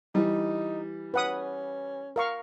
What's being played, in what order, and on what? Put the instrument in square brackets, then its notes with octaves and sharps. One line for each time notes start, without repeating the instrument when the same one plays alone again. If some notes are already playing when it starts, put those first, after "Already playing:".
[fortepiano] E3 G3 [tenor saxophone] D#4
[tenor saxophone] C#4 [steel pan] B4 F#5 D#6
[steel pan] A#4 F5 C#6